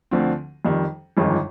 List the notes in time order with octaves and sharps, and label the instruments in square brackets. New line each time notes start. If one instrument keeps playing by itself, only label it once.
[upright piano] D2 D3 F3 C4
F2 D#3 G3
G1 F2 D#3 G#3 D#4